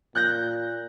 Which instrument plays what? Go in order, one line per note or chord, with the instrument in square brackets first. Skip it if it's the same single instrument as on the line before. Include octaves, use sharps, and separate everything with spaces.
[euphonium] A#2 [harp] F#6 G6 A#6